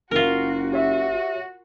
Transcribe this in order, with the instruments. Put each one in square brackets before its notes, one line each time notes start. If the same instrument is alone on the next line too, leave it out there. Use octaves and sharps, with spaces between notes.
[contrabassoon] F#1 [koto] F4 A#4 [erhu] F#4
[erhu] F#4 [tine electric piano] G4 C#5 E5